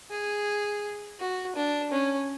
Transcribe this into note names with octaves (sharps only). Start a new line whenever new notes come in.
G#4
F#4
D4
C#4